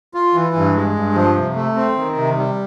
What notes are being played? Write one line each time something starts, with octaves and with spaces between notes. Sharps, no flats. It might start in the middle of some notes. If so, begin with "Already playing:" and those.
F4
E3
G2
G#3
G2
F3
C3
A3
C4
D#3
C3
G3